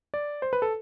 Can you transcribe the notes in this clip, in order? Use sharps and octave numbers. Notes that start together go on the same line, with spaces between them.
D5
C5
B4
A4